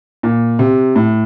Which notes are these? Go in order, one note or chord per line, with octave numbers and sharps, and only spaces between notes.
A#2
C3
A2